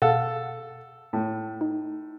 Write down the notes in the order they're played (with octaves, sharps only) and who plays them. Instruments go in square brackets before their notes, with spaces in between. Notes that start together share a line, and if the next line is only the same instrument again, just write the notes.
[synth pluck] B2 F5 F#5 [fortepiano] A4
[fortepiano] A2
[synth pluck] D#4